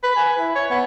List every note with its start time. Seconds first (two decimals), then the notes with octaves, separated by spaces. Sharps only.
0.04 B4
0.16 G#5
0.39 E4
0.55 C#5
0.71 B3